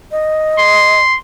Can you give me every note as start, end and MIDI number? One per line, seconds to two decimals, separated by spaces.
0.12 1.00 75
0.58 1.17 84